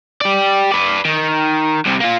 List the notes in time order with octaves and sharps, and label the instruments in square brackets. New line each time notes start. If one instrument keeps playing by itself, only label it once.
[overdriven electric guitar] G4 D5
B4 D5
D#3
C2 C3
A#3 F4